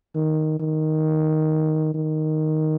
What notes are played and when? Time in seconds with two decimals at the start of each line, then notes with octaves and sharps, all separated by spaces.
0.15 D#3
0.60 D#3
1.95 D#3